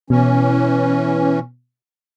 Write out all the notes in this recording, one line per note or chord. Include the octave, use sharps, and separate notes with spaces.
B2 E3 C#4